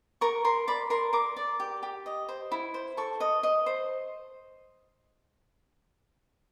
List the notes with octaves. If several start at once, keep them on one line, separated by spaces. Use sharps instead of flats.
A#4 C#6
A#4 C6
D5 B5
A#4 C6
A#4 D6
D5
G4
G4
D#5
C5
E4
C5
A4 C#6
D#5
D#5
C5